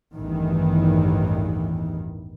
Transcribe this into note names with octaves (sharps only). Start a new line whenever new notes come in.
A1 E2 G2 D#3 E3